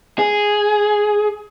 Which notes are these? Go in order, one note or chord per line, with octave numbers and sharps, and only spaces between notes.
G#4